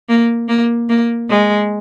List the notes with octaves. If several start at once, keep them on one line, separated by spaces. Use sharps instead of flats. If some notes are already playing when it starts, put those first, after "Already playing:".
A#3
A#3
A#3
G#3